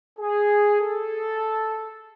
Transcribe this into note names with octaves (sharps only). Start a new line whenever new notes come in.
G#4
A4